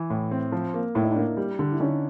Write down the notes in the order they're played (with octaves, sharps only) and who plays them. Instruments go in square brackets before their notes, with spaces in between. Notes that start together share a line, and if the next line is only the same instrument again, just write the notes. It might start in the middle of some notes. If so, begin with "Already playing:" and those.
Already playing: [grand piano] E3
A2
C4
F3
A#3
[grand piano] A2 [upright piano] E4
[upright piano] D#4
D4 E4
[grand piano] A#3
G3
D3
[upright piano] E4
[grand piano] D3 [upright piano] C#4 D#4